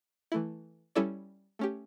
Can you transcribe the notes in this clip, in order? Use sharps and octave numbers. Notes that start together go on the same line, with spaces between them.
E3 A3 E4
G3 C#4 E4 A4 D5
A3 C#4 G4